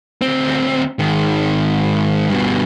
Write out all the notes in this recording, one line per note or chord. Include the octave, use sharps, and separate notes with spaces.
D2 C4
G#2 D#3
G2 B2